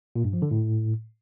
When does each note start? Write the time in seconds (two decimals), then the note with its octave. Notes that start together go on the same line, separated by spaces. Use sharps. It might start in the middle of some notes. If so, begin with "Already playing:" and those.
0.16 A#2
0.24 G2
0.33 F3
0.42 D3
0.51 A2